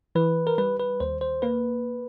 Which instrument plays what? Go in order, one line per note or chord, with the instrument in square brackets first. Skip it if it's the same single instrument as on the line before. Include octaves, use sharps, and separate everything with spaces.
[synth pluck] E3 [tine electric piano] B4
[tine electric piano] A#4
[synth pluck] G3 [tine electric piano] B4
[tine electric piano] B4
[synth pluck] D#2 [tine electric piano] C5
[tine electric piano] C5
[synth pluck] A#3 [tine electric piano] B4